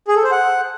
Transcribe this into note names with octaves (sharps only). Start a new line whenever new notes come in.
G#4
A4
C5
F#5